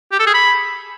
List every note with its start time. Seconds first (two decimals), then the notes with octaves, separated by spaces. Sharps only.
0.12 G4
0.19 A4
0.27 G#4
0.34 B5